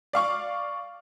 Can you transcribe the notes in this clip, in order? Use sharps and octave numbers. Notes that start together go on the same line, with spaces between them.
D5 F5 C#6